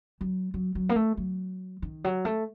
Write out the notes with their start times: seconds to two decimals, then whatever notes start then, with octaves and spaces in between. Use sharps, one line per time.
0.21 F#3
0.54 F#3
0.75 F#3
0.89 A#3
0.96 A3
1.17 F#3
1.82 D#3
2.04 F#3
2.25 A3